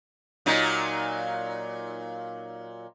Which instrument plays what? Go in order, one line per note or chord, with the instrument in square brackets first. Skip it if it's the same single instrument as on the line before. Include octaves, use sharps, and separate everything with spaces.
[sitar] A#2 F#3 D#4